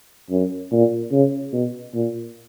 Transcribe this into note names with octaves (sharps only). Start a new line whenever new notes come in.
F#2
A#2
C#3
B2
A#2